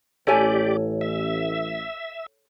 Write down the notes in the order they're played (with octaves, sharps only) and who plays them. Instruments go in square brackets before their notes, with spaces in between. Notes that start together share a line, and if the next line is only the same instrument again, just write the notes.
[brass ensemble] A1 [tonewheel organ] G4 D5 [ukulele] A4 C#5 G#5
[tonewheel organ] E5